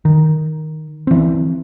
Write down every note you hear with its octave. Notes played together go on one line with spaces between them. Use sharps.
D#3
E3 C4